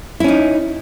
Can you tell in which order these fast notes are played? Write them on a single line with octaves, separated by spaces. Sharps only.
E4 C#4 D#4